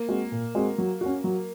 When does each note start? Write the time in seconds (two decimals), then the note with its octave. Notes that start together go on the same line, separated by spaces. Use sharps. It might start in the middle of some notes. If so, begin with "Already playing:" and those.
Already playing: A#3
0.09 G#3 C4 F#4
0.32 A#2
0.55 G#3 C4 F#4
0.78 F#3
1.01 C#4 F#4
1.24 F#3